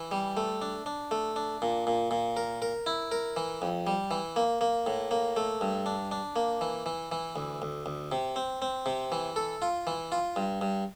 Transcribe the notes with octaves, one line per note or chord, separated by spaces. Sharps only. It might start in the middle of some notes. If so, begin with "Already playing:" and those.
Already playing: E3
G3
A3
D4
D4
A3
D4
A#2
A#2
A#2
A#4
A#4
E4
A#4
E3
F2
G3
E3
A#3
A#3
A2
A#3
A3
G2
D4
D4
A#3
E3
E3
E3
D2
D2
D2
C3
C4
C4
C3
E3
A4
F4
E3
F4
G2
G2